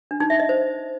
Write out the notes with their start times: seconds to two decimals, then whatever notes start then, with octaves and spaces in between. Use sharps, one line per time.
0.11 D4
0.20 D#4
0.30 E5
0.40 D#5
0.49 C5